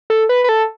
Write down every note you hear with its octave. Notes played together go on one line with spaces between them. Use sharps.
A4
B4
B4
A4